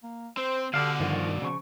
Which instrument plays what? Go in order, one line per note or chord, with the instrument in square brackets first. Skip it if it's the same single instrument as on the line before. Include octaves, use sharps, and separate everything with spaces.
[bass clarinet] A#3
[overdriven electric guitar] C4 [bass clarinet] C5
[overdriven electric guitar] B2 D5 [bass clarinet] D3 [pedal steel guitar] G4 A4 F5
[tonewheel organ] G2 D#3 [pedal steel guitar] F3 F4 F#4
[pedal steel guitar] C#3 C#6 [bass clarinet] F3